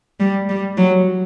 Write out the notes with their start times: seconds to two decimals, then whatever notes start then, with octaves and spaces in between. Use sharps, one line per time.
0.20 G3
0.49 G3
0.77 F#3